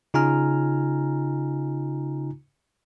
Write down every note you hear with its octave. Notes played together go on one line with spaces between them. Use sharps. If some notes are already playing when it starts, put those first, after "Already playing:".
C#3 D#4 F4 G#5 A#5 F6